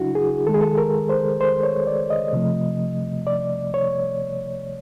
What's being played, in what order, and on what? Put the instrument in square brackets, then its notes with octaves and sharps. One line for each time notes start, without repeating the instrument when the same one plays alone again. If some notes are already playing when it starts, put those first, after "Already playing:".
Already playing: [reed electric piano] C#3 F#3 D4 E4 F#4
G#4
D#3 A4
G#3
G#4
A4
A#4
C5
C5
C#5
D5
D#5
C3 F3 A3
D5
C#5